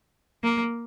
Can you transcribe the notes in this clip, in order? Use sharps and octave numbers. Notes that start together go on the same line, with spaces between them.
A#3